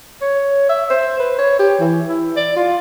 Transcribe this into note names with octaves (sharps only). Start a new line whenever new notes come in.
C#5
E5
C5
B4
C#5
G4
E3
E4
D5
F4